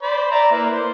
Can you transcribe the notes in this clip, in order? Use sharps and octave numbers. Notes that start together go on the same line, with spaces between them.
C5 D5 B5
D5 E5 A#5
A#3 E4 B4
C5